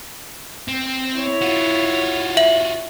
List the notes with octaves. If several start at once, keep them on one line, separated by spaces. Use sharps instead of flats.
C4
E4 C#5
F4 F#4
E5 F#7